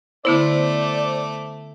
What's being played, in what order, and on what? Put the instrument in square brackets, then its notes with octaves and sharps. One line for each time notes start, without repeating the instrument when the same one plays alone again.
[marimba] D3 B3 E4 [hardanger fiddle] A3 D6 [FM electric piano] C5 [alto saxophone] D5